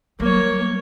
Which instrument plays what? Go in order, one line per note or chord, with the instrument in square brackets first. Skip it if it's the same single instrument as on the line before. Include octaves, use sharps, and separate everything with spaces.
[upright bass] F#3 G3 [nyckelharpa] A#3 C#5